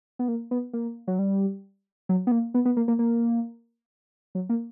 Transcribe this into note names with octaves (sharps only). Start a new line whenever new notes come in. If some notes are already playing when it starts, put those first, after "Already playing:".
B3
A#3
B3
A#3
F#3
G3
F#3
B3
A#3
B3
B3
A#3
A#3
A#3
F#3
A#3